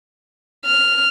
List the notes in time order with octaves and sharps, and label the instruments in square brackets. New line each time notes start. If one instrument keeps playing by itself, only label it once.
[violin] F6